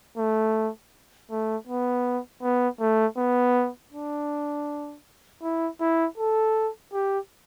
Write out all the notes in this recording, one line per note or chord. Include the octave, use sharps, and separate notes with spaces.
A3
A3
B3
B3
A3
B3
D4
E4
E4
A4
G4